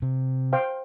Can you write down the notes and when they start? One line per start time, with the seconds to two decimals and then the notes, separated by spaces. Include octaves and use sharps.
0.02 C3
0.53 C5 F5 G5